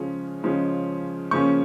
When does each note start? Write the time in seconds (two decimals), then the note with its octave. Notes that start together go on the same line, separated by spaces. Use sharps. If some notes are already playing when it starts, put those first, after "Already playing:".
Already playing: C#3 F3 G#3 C#4
0.43 C#3 F3 G#3 C#4
1.31 C#3 F3 A#3 C#4 C#6